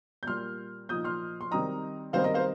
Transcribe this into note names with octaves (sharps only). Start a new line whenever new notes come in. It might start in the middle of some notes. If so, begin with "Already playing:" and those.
G6
A#2 G3 A#3 C6 F6
A#2 F3 D#4 D#6 G6
C6 F6
C6
D#3 G3 C4 D#4 A#5 D#6
D#3 G3 C4 D#4 C5 F5
A#4 D#5
C5 F5